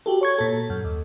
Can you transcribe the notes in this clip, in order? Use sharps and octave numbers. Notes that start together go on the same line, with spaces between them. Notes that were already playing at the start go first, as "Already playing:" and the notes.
F#4 G4 A4
C#5 C#6 G#6
A#2 A4
F#2
D#2